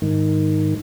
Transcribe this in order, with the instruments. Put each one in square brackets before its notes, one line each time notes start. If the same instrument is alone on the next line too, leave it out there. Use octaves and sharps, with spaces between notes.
[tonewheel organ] G#2 D#3